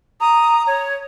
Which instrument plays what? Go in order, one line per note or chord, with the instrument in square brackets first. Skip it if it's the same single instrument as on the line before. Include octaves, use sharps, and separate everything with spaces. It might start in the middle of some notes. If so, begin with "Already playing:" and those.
[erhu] A#5 [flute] D#6
[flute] C#5